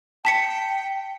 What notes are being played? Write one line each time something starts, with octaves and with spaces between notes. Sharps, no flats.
G5 A5 B6 C#7